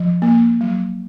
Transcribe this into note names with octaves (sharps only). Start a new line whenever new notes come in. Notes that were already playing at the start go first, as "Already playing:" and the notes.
Already playing: F3
A#3
F#3